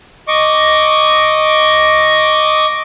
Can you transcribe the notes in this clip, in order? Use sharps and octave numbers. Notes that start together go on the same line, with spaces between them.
D#5 C#6 D6